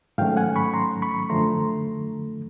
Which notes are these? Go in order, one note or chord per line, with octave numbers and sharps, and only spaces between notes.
G#2 D#3 F#3 A3 C#4 F5 G5
F#5 G#5
B5 C#6
A#5 C6
B5 C#6
F#2 D3 F3 A3 A#5 C6